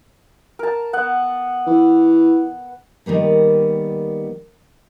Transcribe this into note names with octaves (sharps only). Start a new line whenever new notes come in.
A#4 A5
B3 F#5
E3
D#3 G3 A#3 B3